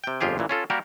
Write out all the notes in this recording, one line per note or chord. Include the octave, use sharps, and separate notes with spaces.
C3 G5
G1 F2 F4 G4 G#4
A1 A#2 E3
C#4 F4 A4
G3 A#3 F#4 G4 A#4